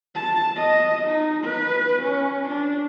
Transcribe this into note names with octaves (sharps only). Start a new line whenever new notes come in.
A5
D#5
D#4
B4
C#4
D4